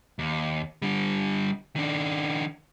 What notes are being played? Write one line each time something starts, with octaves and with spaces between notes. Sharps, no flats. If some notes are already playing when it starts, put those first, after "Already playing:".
D#2
D3 G3
D#3 D4